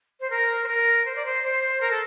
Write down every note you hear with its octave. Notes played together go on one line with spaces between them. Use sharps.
C5
A#4
C5
A#4
C5
D5
C5
C5
A#4
A4